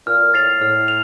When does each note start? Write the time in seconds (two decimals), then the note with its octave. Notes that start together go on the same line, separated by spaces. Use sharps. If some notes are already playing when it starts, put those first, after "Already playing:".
0.07 A#2 F6
0.33 A2 A6 C7 F7
0.61 A2 F6
0.88 F7